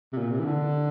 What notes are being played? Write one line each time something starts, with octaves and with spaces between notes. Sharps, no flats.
C3
A#2
C3
E3
D3